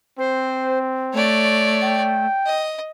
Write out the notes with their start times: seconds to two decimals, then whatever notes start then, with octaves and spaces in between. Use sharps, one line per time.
0.19 C4 C5
1.13 A3 C#5 D5
1.83 G5
2.46 D#5